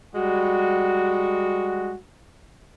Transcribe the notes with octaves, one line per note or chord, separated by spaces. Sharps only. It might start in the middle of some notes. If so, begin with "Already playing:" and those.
G3 G#3 F#4